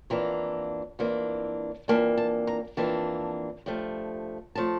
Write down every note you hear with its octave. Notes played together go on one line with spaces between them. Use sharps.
F2 E3 A#3 D4 A#5
F2 E3 A#3 D4
F2 E3 A#3 D4 A5
A5
A#5
F2 E3 A#3 D4 A5
G2 F3 A3
F3 A3 A5